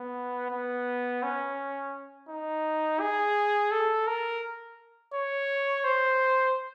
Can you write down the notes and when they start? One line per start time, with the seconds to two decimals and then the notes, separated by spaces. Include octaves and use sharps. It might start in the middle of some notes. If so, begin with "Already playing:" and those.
Already playing: B3
0.51 B3
1.23 C#4
2.29 D#4
3.01 G#4
3.72 A4
4.07 A#4
5.14 C#5
5.84 C5